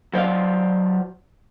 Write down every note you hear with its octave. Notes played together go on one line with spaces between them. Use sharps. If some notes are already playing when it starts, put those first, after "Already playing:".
F#3 C5 D5 F5